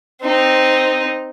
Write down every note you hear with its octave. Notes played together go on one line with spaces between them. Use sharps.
C4 D#4